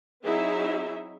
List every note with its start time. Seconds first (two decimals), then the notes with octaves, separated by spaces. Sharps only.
0.24 F#3 C4 D#4 E4 G#4 E5